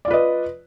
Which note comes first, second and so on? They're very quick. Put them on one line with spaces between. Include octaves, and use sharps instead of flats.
D5 F4 B4 D#5